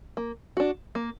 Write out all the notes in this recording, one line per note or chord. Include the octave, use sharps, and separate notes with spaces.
A#3
D4 F#4
A#3